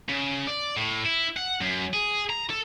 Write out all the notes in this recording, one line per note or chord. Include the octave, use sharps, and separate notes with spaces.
C#3
D5
A2
E4
F#5
F#2
G#4
A#5
A4